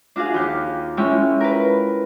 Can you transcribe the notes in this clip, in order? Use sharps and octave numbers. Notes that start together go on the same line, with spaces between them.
D4 F4 F#4 G#4 F5
D#2 G4 G6
G#3 C#4 E4 F4 G5
A#4 B4